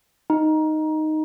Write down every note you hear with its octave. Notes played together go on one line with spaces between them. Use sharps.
D#4